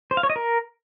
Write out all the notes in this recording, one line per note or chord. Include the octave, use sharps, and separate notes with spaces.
C5
F5
C#5
D#5
A#4